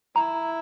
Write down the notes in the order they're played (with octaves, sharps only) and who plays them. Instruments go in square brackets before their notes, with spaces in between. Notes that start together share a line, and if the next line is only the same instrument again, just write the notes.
[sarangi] E4 [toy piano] A#5